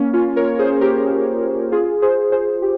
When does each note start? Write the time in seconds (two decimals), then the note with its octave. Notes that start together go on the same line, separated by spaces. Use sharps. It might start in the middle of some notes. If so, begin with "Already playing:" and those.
Already playing: A#3 C#4
0.13 C#4 F4
0.36 A#4 C#5
0.59 G#4 C5
0.81 G4 A#4
1.72 F4 G#4
2.02 G#4 C5
2.32 G#4 C5
2.62 G4